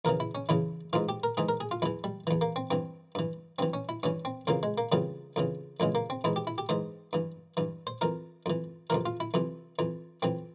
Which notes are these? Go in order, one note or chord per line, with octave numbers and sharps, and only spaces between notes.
E2 C#3 E3 A#4
E4
C#4
E2 C#3 E3 E4
G#2 E3 F4
G4
A#4
G#2 E3 G#4
A#4
G#4
F4
E2 E3 E4
G3
E2 E3
A#3
C4
G2 E3 C4
G2 E3
G2 E3 C4
C#4
E4
G2 E3 C#4
C4
F2 C#3 E3 A#3
G#3
A#3
F2 C#3 E3 G3
F2 C#3 E3
F2 C#3 E3 G#3
A#3
C4
G#2 E3 E4
G4
E4
G4
G#2 E3 C5
G2 E3
G2 E3
C5
F2 E3 A#4
F2 E3
F2 C3 E3 A#4
F4
E4
F2 C3 E3
F2 E3
F2 E3 C4